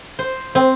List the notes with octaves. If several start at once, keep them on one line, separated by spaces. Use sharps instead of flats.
C5
C4